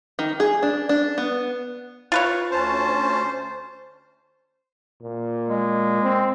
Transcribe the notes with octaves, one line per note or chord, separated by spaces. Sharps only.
D#3
G#4
D4
D4
B3
F4 B4 C#5
D2 C#4 C5 A5
A#2
G#3
C4